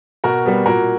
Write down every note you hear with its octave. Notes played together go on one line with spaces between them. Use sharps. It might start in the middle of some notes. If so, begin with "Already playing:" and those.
B2 F#4 A#4
G3 B3
A#2 F#4 A#4